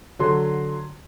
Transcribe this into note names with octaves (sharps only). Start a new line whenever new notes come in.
D3 F#3 C6